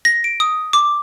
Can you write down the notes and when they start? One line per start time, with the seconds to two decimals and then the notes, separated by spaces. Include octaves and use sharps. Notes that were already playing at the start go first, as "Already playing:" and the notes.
0.05 A#6
0.24 D7
0.40 D#6
0.73 D6